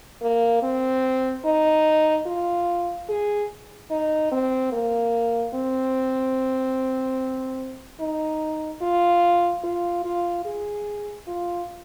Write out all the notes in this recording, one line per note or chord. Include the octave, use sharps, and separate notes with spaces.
A#3
C4
D#4
F4
G#4
D#4
C4
A#3
C4
D#4
F4
F4
F4
G#4
F4